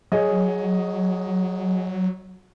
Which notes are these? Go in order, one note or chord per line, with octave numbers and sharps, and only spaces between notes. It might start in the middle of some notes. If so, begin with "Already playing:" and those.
F#3 G#4 C#5 D#5